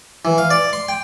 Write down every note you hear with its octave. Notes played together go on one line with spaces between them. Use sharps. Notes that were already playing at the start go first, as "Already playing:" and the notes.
E3
F5
D5
C6
G5